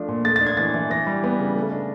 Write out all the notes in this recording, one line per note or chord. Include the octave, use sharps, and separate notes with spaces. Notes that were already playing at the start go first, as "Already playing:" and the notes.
Already playing: F3 A3 D4
A#2
A3 A6
A6
D4
G#6
E3 A6
E3
E3 A#6
G3
B3
C#3
A3
D4